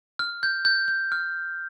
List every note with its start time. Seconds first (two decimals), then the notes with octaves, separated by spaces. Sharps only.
0.19 F6
0.43 G6
0.65 G6
0.88 G6
1.12 F6